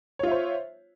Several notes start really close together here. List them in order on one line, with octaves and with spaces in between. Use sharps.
C#5 F4 E5 C5